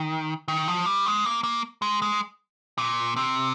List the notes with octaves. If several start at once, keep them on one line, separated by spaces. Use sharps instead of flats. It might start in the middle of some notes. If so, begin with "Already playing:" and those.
Already playing: D#3
D#3
F3
G3
G#3
A#3
A#3
G#3
G#3
A#2
C3